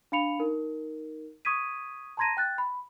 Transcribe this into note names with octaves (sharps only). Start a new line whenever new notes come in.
D4 F5 B5 C#7 F7
D#4 A#4
C#6 D#6 G#6 B6 D#7
A5 A#5 C6 G#6 A#6 D#7
G5 F#6 A6
B5